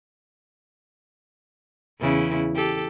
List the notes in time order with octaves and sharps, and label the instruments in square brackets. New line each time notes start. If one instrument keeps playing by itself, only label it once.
[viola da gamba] E2 C#3 E4
G4 A4